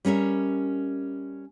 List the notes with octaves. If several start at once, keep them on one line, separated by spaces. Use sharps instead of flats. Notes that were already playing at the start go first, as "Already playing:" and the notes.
G3 C#4 A#4 E5